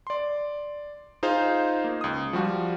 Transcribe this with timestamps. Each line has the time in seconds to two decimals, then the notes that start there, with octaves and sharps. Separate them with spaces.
0.07 D5 C6
1.23 D#4 F4 G#4 C5 F5
1.84 A#3
2.01 C#2 D#6
2.33 F3 G3 F#4